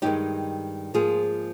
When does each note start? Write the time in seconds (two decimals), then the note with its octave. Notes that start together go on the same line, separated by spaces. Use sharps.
0.02 G2 D#3 G#3 D#4 G4
0.94 G#2 F3 A#3 F4 G#4